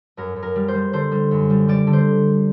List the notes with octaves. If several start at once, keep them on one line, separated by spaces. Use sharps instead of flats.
F#2 A#4
F#2
A#4
G3
C5
G3
D3 C5
G3
F#2
G3
G3 D5
D3
C5